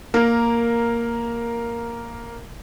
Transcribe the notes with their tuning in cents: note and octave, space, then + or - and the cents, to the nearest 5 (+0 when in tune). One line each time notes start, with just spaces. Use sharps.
A#3 +0 A#4 +0